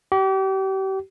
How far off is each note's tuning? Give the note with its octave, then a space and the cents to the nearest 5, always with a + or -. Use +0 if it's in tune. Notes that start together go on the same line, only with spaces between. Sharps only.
G4 -35